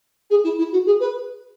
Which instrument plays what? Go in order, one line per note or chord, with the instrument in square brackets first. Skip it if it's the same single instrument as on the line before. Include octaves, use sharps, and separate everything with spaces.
[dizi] G#4
E4
E4
F#4
G#4
B4